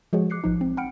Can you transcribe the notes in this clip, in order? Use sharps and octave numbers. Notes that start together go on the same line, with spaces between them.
F3 G#3 F#4 G#4 C#5
D6 F#6 C7 C#7
A1 F3 D#4
C4
F#5 G5 B5 F6 C#7 D7